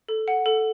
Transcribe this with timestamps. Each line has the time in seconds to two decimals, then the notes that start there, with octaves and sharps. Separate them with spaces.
0.09 A4
0.28 F#5
0.46 A4